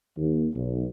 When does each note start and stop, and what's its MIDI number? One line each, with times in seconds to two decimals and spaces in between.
0.18 0.48 39
0.55 0.87 35